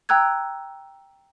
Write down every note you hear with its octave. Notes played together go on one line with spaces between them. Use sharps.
G5 A#5 E6 F#6 G#6